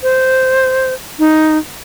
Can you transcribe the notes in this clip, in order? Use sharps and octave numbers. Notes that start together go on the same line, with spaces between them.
C5
D#4